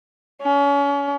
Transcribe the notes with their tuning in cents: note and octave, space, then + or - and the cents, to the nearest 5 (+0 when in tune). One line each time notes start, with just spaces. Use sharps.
C#4 +35